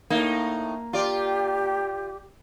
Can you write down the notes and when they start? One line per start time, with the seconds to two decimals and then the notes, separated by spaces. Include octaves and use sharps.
0.10 A2 A#3 D#4
0.93 F4 G4 D5